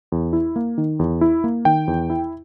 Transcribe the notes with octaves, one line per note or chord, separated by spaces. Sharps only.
E2
E4
A#3
D#3
E2
E4
A#3
D#3 G5
E2
E4